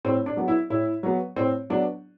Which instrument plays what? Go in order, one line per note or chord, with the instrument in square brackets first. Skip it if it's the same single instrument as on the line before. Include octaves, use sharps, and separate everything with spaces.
[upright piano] A2 C4
D4
F#3 B3
E4
A2 E4
F#3 B3
A2 C4
F#3 B3 D4